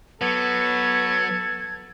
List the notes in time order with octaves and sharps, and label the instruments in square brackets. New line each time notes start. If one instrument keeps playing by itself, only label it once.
[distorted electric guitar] F#3 [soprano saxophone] B3 [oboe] A4 [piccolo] G#6